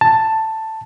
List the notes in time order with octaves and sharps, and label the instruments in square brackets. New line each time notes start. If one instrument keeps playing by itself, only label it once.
[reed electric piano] A5